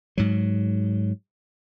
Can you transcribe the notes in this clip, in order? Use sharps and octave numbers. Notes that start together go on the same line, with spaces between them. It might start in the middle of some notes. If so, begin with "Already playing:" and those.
G#2 F#3